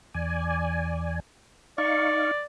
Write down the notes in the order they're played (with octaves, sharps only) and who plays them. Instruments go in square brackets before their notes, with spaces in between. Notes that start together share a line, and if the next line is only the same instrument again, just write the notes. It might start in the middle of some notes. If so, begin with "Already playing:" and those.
[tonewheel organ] E2 D5 G#5
[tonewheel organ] D#4 F5 C#6 [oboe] D5